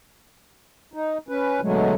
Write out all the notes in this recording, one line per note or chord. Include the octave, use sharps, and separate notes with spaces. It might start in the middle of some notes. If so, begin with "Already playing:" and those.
D#4
C#4 B4
B2 D3 F#3 G#3 A3